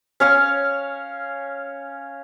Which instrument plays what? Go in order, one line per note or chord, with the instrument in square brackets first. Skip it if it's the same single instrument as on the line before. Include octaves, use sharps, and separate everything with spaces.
[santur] C#4 C#5 F5